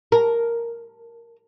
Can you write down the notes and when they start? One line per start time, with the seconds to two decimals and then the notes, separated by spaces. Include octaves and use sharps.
0.12 A#4